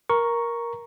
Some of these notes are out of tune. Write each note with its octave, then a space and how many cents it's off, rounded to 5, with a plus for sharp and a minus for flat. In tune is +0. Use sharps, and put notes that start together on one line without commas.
A#4 +10 A#5 +0 C#6 +0